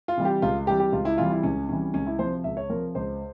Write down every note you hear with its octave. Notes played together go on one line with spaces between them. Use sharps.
F4
C3 E3 G3
G4
C#2 F4
C3 E3 G3 G4
G4
C#2 F4
E4
C3 E3 G3 F4
E4
C#2 C#4
C3 E3 G3 C#4
C#2 C#4
E4
C3 F3 C5
C#2 E5
C#5
C3 F3 A#4
C#2 C5